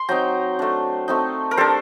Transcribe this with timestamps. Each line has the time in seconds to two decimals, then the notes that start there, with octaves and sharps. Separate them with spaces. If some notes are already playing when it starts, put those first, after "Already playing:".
Already playing: C6
0.09 F#3 C4 D#4 G5 A#5
0.59 A3 D4
1.08 A3 C4 D#4
1.51 A#4
1.57 G3 D4 A4 C5